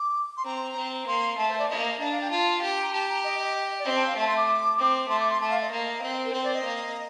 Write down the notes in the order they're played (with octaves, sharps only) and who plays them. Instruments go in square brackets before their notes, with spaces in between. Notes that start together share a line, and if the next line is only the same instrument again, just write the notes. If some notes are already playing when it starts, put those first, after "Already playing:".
Already playing: [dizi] D6
C6
[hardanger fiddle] C4 [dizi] A#5
[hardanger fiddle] C4
[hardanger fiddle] A#3 [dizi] C6
[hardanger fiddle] A3 [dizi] A5
[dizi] C5
D5
[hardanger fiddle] A#3 [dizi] D#5
[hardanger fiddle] D4 [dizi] D#5
[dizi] F5
G5
[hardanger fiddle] F4 [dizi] A5
[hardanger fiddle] G4
[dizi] A#5
[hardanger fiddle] G4 [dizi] A5
[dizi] A#5
D#5
D#5
D5
[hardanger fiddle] C4 [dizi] D#5
[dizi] A5
F5
[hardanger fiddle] A3 [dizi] A5
[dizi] C6
D6
[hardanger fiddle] C4
[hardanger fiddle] A3 [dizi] C6
[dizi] D6
C6
[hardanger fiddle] A3 [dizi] A5
[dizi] F5
D#5
[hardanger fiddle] A#3
C4
[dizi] A#4
[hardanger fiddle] C4 [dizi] C5
[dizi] D5
D#5
[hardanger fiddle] A#3